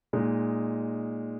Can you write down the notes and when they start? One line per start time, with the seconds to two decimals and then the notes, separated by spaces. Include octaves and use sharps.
0.13 A#2 G#3 D#4